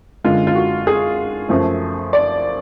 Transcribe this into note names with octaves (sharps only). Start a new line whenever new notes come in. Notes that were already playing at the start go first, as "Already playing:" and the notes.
F#2 D3 G#3 F4
F4
F#4
G#4
F#2 F3 A3
D5